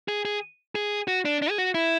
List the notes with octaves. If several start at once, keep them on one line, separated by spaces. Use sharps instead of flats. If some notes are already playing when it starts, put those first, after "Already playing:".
G#4
G#4
G#4
F#4
D4
D4
G#4
F#4
E4